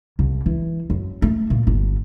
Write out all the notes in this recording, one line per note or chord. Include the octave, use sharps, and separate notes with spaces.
C2
E3
F#2
A3
A#2
G1